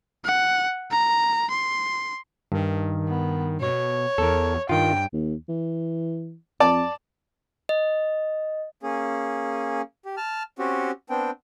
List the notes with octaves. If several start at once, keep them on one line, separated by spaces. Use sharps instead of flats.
F#5
A#5
C6
G2 D#3
B3
B2 C#5
E2 A4 A#4
G2 D#3 F4 G5
D#2
E3
F2 D5 A5
D#5
A#3 C#4 G#4
G4
A5 F6
C4 C#4 F#4 G4
B3 C4 D4 G5